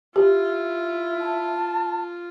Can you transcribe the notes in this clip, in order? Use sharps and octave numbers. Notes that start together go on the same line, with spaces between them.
E4 F4 G4
A5